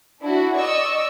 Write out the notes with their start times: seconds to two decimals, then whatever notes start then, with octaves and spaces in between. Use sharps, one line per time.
0.22 D4 E4 F#4
0.55 D5 D#5 C#6 E6